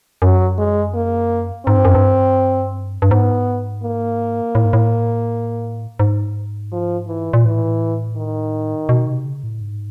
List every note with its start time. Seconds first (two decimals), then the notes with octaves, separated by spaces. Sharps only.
0.22 F#2 F#3
0.58 G#3
0.95 A#3
1.66 G#2 C4
1.76 G2
1.85 F#2
1.95 G2
3.02 G2
3.11 G#2 B3
3.83 A#3
4.55 A2
4.65 G#2
4.73 A2
6.00 G#2
6.73 F3
7.08 E3
7.33 A#2
7.45 A2 E3
8.17 D#3
8.89 B2
9.07 C3
9.25 C#3
9.44 A2
9.61 G#2